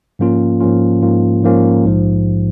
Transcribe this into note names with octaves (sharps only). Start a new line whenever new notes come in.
G#2 F3 A#3 C#4 F4
G#2 F3 A#3 C#4 F4
G#2 F3 A#3 C#4 F4
G#2 F3 A#3 C#4 F4
A#1 G#2 F3